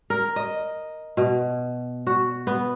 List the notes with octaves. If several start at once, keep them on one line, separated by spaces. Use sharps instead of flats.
A#4
D#5
B2
F#4
B3